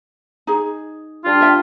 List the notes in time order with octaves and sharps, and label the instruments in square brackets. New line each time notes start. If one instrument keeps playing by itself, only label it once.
[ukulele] D#4 G#4
[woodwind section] G3 D4 F4
[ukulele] B4 E5 G5